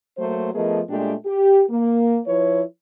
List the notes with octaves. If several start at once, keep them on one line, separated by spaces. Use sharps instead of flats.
F#3 A3 A#3 C5
F3 A3 B3 G#4 A#4 D#5
A#2 G#3 A3 D4 G4
G4
A#3
F3 E4 B4 C#5